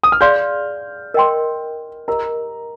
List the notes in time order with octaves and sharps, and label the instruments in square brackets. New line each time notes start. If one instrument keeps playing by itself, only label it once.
[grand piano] D#6
F6
[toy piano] G#4 D5 F5 C6 [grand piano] G6
[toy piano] A#4 D#5 G5 C6
[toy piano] G4 A#4 D#5 [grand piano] A#5